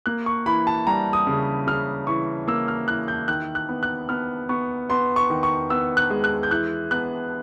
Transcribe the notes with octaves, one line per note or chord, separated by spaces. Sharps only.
A#3 F#6
C#6
E3 B5
A5
G3 A#5
D#6
C#3
C#3 F6
E3 C#6
A#3 E6
F6
E3 F#6
G6
D#3 F#6
F#6
B3
F#6
B3 F6
B3 C#6
B3 C6
C#6
D#3
C#6
B3 E6
F#6
G#3
F#6
G6
E3 F#6
B3 F#6